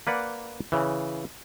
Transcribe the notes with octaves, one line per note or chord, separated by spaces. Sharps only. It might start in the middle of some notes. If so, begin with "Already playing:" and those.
A#3 B4 D5 F#5
C#3 E3